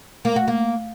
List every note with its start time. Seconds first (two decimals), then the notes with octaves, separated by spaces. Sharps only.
0.25 A#3
0.36 F#4
0.48 A#3